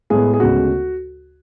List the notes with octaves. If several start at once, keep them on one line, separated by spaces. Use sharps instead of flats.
A2 G#3 B3 G#4
G#4
D2 C#3 G#3 B3 F#4